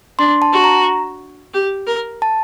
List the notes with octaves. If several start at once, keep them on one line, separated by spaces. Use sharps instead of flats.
D4 C6
A5
F#4
A#5
G4
A#4
A5